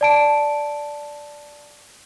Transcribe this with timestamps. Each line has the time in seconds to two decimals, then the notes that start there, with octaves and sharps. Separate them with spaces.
0.01 D5 A5 D7